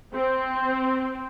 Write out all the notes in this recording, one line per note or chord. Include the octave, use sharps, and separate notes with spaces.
C4